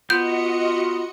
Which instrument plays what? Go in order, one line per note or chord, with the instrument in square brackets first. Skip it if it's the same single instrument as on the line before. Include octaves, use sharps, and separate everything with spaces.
[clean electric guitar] B3 [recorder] F4 [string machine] F#4 D#5 C#7 [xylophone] G6